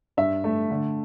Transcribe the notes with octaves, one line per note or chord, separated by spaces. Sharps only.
G2 E5
A3
D3